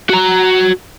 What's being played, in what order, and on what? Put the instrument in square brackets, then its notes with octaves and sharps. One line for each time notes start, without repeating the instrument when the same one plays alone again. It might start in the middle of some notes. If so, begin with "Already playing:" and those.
[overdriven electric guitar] F#4 A#5